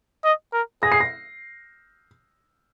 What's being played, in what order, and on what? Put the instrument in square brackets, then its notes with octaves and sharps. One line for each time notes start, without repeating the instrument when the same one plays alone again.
[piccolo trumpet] D#5
A#4
[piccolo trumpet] G#4 [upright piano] A#6
[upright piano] C7
A#6